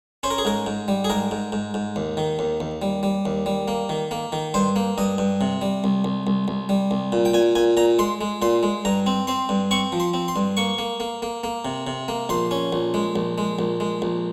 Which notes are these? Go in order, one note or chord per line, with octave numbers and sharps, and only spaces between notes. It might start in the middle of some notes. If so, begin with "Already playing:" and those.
C#4 C5
A#4
G#4
G#2 A#4
G#2
G3
G#4
G#2 A#4
G#2
G#2
G#2
D#2
D#3
D#2
D#2
G3
G3
D#2
G3
A#3
D#3
A#3
D#3
G2 C5
A#3
G2 D#5
G2
C3
G3
C2
C2
C2
C2
G3
C2
A#2
G5
A#2 G#5
A#2 G#5
A#2 A#5
G#3 C6
G#3
A#2 C6
G#3
G2 A#5
C4
C4 C6
G2
C4 C#6
F3
C6
C4
C6
G2
A#3 C#6
A#3
A#3
A#3
A#3
C3
C3
A#3
A#1 C6
C#4
A#1
G#3
A#1
G#3
A#1
G#3
A#1